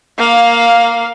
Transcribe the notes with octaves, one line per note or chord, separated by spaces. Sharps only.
A#3 F5